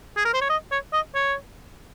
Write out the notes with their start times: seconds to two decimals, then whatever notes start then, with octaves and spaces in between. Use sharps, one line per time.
0.17 G#4
0.25 A#4
0.34 C5
0.42 C#5
0.50 D#5
0.72 C#5
0.93 D#5
1.15 C#5